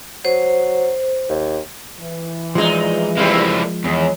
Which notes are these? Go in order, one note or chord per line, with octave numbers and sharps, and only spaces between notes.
F#3 C5
D#2
E3
E2 A2 F3 G#3 D#4
G3 A#3 C4 E4 F#4
E2 D#3 G#4 C#5